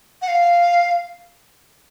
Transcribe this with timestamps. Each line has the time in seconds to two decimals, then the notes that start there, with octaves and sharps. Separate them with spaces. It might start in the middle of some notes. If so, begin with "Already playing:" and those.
0.22 F#5
0.28 F5